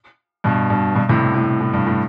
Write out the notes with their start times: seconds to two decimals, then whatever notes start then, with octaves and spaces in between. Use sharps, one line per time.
0.44 G2 B2
0.70 G2 B2
0.95 G2 B2
1.09 A2 C3
1.34 A2
1.61 A2
1.73 G2
1.86 A2